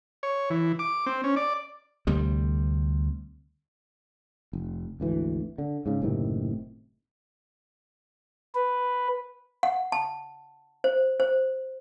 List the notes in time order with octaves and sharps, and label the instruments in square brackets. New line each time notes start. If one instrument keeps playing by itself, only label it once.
[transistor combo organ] C#5
E3
D6
C4
C#4
D5
[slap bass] D2 C3 G3
[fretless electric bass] F1
G#1 D2 E3
D3
G#2 C#3
F#1 A2 C3 D#3
[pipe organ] B4
[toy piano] F#5
A5
C5
C5